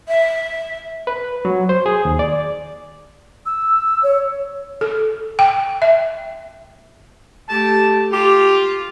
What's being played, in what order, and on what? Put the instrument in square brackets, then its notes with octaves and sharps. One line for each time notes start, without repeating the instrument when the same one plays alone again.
[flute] E5
[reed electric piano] B4
F#3
C5
G#4
D#2
D5
[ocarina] E6
C#5
[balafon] A4
G5
E5
[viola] A3 G4 [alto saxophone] A5
[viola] F4 [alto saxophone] G4